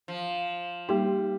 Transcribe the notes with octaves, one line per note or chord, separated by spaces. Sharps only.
F3
G3 A#3 D#4 G4